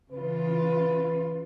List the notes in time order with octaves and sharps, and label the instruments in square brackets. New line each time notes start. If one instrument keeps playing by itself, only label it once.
[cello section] C#3 E3 F4 [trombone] B4